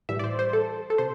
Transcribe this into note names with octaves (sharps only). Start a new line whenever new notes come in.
A2 E3 G3 E5
D5
C5
C5
A4
A4
C3 C5